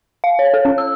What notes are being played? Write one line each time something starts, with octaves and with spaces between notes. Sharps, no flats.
F5
C#5
A4
C#4
E6